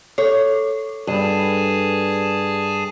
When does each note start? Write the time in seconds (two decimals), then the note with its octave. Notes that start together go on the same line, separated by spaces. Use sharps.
0.18 A4 C#5
1.07 G2 G#4 G#5 A5